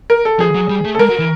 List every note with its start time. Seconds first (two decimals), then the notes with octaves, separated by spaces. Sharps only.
0.10 A#4
0.25 A4
0.39 F3 G#4
0.55 F#3
0.70 G3
0.85 A3
0.95 A4
0.99 G#3 A#4
1.09 F#3
1.19 E3